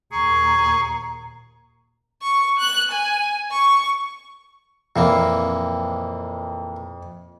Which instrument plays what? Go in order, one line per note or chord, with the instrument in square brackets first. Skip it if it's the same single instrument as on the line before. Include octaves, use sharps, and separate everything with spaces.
[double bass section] D#2 A#2 [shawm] G#4 [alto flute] A#5 [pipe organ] C#6
[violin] C#6
F#6
G#5
C#6
[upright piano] F2 [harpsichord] A#2 E3 A#3